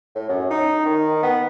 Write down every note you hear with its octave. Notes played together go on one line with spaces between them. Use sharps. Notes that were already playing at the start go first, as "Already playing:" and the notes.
A2
F#2
D#4
D#3
B3